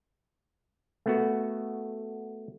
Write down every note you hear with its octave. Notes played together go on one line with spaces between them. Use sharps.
A3 B3 F#4